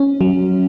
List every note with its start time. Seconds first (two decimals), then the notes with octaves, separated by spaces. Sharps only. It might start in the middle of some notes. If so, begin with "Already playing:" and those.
Already playing: C#4
0.21 F#3